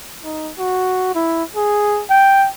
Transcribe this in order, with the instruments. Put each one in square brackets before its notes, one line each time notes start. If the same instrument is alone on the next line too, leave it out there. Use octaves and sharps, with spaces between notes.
[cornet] D#4
F#4
E4
G#4
G5